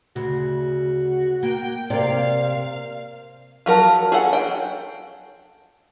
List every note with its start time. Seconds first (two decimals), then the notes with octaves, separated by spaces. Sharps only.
0.16 D2 C#3 F#4
1.43 A#3 G5
1.90 C3 A#3 D5 F5
3.66 F3 F#3 A#4 F5 A5
4.12 G#4 A4 F#5
4.33 G5